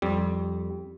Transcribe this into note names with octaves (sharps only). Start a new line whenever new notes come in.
F2 G3